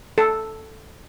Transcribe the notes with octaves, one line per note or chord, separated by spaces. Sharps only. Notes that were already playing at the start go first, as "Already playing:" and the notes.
A4